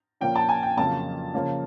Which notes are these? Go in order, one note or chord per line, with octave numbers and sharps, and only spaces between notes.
A#2 F3 A#3 C#4 G5
A5
G#5
G5
F2 C#3 F#3 A#3 C#4 A5
C#3 F3 A#3 C#4